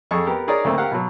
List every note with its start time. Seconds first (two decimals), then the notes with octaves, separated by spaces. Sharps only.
0.11 F2 G#4 A4 C#6
0.26 B3 G4 A#4
0.48 D#4 G#4 A#4 C#5 D5
0.64 D2 A3 A#3 C4
0.78 G4 A#4 F5 F#5
0.91 B2 F#3